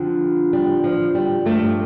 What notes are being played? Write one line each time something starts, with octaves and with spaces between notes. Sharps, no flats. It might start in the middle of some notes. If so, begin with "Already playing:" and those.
Already playing: F2 D3 F3
G3
F3
G3
G2 F3 A3